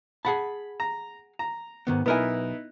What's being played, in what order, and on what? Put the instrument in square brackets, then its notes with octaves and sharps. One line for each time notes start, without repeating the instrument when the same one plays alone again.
[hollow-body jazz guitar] G#4 F#5 A5 [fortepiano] B5
[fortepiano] A#5
A#5
[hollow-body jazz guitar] G#2 D#3 B3
[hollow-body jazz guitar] B1 A#4 G#5 [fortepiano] B3 D#4 E4